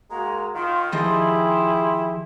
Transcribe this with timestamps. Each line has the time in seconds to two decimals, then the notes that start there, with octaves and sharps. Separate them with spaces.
0.11 G#3 A#3 F#4 A#5
0.55 D#3 F4 C6
0.92 D#3 F3 E4 G4 G#4 D#5